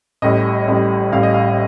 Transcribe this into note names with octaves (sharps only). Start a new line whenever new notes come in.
A1 A2 G3 D#5
A1 A2 G3
A1 A2 G3 F5
D#5
F5